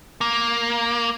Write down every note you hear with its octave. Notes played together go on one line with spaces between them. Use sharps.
A#3